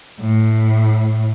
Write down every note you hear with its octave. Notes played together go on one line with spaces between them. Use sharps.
A2